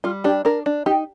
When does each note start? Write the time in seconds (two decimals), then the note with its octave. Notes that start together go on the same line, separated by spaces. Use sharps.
0.04 G3 F4
0.24 D4 G4
0.45 D4 A#4
0.66 D4
0.86 D#4 G4